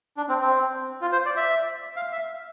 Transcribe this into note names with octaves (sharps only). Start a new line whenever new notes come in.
D4
C4
C4
F4
C5
D5
E5
F5
E5